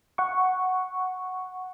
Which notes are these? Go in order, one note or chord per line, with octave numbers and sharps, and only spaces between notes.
F#5 C#6